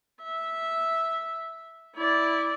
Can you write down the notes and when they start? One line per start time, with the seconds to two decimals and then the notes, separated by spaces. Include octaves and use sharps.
0.23 E5
1.96 E4 D5